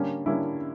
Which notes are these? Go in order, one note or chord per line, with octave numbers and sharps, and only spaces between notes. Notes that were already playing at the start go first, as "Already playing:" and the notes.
Already playing: D3 G3 A#3 C#4
D3 G3 A#3 C#4 E4